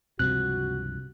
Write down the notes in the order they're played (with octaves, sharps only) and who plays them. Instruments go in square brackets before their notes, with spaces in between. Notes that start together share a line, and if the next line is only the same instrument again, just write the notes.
[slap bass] C#2 G2 F3 [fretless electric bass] C3 [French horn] F#4 [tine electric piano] F#6